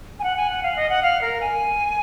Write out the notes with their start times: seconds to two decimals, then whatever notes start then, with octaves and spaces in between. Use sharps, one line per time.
0.19 G#5
0.24 F#5
0.37 G#5
0.50 F#5
0.63 F5
0.76 D#5
0.89 F#5
1.03 F5
1.22 A#4
1.41 G#5